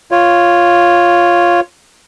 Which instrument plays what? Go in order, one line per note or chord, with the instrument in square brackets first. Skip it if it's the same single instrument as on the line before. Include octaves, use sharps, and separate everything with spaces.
[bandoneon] F4 C#5